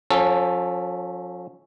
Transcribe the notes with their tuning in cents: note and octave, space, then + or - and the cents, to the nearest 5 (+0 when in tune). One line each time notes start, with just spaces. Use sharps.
F3 +35 C#4 +0 A4 +0